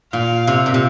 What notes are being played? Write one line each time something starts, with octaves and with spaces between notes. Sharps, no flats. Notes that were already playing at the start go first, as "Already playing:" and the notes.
A#2 F5
C3
A#2
C3